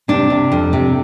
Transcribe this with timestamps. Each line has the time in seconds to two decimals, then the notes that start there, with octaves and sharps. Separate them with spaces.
0.08 C3 D4
0.30 C3
0.52 F2
0.73 C3